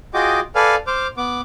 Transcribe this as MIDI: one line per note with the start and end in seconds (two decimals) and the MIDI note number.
0.14 0.40 65
0.14 0.40 66
0.14 0.40 68
0.14 0.40 75
0.14 0.40 79
0.14 0.40 86
0.55 0.75 69
0.55 0.75 71
0.55 0.75 74
0.55 0.75 77
0.55 0.75 80
0.55 0.75 89
0.87 1.07 72
0.87 1.07 86
0.87 1.07 89
1.17 1.41 59
1.17 1.41 86